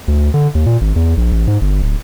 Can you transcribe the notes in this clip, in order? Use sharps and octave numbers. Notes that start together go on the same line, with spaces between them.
D2
D3
D#2
A#2
G#1
E2
A#1
A1
G#2
G1
D1